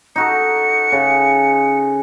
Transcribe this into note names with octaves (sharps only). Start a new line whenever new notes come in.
D#4 F#4 A4 C#7
C#3